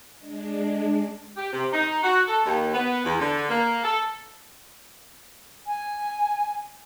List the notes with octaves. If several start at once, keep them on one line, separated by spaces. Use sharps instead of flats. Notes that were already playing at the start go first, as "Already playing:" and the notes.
G#3 D4
G4
C3
D#4
F#4
A4
D#2
B3
E2
D3
A#3
A4
G#5